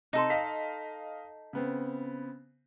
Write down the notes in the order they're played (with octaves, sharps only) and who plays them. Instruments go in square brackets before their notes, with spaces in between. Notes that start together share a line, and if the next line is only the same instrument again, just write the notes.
[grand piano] C3 [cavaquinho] D#4 A4 C6
[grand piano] D#5 F5 B6
C#3 B3 C4